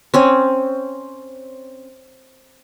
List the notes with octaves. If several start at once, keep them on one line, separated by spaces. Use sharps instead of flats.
C4 C#4